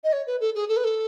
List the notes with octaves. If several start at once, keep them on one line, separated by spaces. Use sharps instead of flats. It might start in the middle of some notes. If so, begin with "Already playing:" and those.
D#5
C#5
B4
A4
G#4
A4
B4
A4